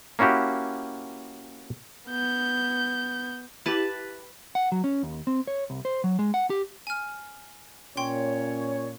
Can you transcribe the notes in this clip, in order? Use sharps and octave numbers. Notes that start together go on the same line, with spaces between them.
A#3 C#4 E4 F#4 G4
B3 G6
E4 G4 B4 A5
F#5
F#3
C#4
D#2
C4
C#5
C2
C5
F#3
G#3
F#5
G4
G#5 F6
A#2 C#4 C#5 G5 C6